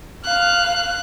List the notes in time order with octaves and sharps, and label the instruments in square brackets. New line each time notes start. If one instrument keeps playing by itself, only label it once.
[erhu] F5 [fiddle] F#6